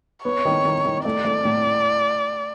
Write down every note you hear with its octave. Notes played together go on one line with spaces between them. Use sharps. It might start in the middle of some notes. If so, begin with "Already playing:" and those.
B3 C#5
D#3
D#3
D#3
A3 D5
A3
A2